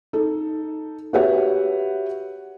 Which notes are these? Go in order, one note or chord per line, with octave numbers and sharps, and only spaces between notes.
D#4 A4
F#4 G4 B4 C#5 E5 F#5